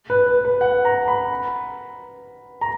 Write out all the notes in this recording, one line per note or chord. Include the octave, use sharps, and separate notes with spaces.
B4
B4
B4
F#5
A#5
B5
A#5